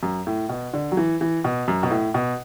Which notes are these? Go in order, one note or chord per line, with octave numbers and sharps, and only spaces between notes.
F#2
A2
B2
D3
F#3
E3
E3
B2
F#2
B2
A2
B2